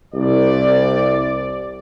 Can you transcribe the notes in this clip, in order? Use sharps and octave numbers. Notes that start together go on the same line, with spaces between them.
C2 D5